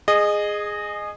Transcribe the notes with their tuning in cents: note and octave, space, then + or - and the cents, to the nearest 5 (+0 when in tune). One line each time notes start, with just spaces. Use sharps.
G#4 +0 D#5 -20